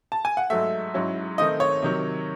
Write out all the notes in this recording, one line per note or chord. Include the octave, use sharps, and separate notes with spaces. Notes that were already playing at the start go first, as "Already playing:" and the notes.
A5
G#5
F#5
G#2 F#3 A3 E5
G#2 F#3 C#4 E4
D#3 A3 C4 D#4 D#5
C#5
C3 D#3 F#3